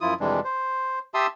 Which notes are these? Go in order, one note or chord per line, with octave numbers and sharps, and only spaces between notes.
F#2 F3 E4 F4 D#6
F2 C3 E3 G3 G#3 D4
C5
G4 E5 A5 C6 D#6 E6